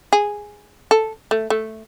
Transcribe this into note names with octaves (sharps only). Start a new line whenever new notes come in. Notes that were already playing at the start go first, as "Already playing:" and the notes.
G#4
A4
A3
A3